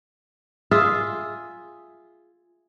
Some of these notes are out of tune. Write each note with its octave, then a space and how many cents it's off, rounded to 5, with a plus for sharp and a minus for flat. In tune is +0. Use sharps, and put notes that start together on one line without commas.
F4 +0 G#4 +0 E5 +0